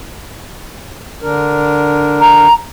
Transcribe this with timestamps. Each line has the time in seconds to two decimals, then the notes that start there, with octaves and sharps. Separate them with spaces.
1.22 D3 D4 A#4
2.21 A#5